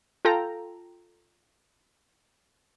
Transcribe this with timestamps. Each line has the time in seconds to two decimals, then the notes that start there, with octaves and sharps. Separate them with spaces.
0.25 F4 A4 G5 A#5